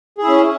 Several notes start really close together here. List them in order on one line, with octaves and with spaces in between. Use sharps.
G#4 E4 C#4